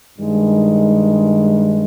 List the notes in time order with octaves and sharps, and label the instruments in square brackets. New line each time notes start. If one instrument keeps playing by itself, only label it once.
[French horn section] G2 D#3 G#3